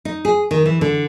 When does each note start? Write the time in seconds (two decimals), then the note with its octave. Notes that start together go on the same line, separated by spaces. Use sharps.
0.05 D#4
0.25 G#4
0.51 D#3
0.66 E3
0.81 D3